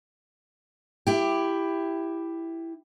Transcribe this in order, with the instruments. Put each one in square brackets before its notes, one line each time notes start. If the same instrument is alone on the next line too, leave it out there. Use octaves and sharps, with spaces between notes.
[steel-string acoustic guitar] E4 G4